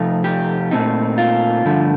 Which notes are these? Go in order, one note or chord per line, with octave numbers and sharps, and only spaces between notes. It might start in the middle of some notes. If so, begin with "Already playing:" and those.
Already playing: C3 F3 A3 D#4
G4
A#2 A3 C4 D#4
F4
G2 D3 F3 A3